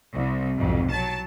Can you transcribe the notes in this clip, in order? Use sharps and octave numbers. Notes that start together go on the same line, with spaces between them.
C2
B1 F2 G#2
F#3 A5